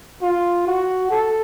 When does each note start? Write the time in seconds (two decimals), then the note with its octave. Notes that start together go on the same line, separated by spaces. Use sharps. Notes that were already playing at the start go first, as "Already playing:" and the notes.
0.22 F4
0.67 F#4
1.11 A4